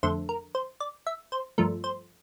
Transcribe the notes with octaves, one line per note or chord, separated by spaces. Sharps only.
F2 D3 A3 C5
A#4
C5
D5
E5
C5
G2 F3 A3 A#4
C5